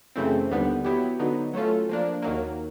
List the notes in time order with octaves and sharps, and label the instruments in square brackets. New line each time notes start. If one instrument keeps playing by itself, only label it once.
[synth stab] F#2 C#3 E3 A3 C4
D#2 D3 G3 B3
F#3 B3 E4 G4
D3 F#3 B3 D#4
F#3 A3 C#4 F4 A4
F3 A#3 D4
D#2 D#3 F#3 A#3